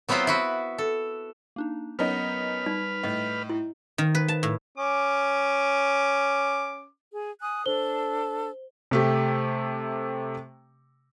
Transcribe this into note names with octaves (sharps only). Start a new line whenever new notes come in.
F#3 B3 C4 E4 F4 C5
E4 F#4 B4
A4
A#3 D4 D#4
F#3 B3 C#4 D#4 A#4 B4 F6
G3 D#4
A2 D#5
E4
D#3
B4
A5
A2
C#4 D6
G#4
G#5 D#6 F#6
D4 A4 C5 G7
C3 A3 G4